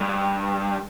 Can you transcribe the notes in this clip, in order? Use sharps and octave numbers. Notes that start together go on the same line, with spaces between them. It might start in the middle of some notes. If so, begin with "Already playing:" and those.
G2